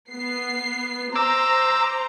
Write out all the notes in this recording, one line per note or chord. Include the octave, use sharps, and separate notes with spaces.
B3 C7
C5 A#5 D6 E6